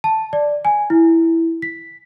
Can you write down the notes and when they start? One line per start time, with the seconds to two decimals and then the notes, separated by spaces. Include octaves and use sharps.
0.04 A5
0.33 D5
0.65 G#5
0.90 E4
1.62 B6